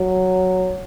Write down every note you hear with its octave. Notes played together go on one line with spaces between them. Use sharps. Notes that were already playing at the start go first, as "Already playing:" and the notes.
Already playing: F#3